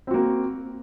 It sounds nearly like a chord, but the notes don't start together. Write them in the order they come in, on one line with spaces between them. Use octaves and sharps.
C4 F#4 A#3